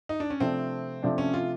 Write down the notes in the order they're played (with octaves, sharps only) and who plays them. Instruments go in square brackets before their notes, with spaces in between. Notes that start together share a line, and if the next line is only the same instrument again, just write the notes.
[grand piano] D#4
D4
C#4
[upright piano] C3 F3 A3 D4 [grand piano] C4
[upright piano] C3 F3 A3 D4
[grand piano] C#4
F4